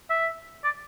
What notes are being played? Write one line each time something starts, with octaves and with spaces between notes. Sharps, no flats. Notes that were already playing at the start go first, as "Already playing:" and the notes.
E5
D5